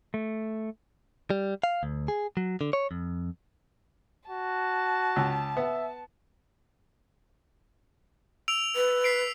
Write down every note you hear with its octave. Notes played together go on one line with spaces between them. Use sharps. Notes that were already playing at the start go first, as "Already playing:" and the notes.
A3
G3
F5
D2
G#4
F#3
D3
C#5
F2
F#4 A5
C#2
B3 E5
E6 D7 F7
B4
B6 C7 D7